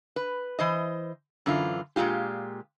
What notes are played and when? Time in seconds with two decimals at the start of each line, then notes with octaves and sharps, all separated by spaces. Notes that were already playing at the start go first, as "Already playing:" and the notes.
0.16 B4
0.59 E3 C5 D#5
1.46 F#2 D3 E3 F4
1.96 A#2 C#3 G#3 F4 G4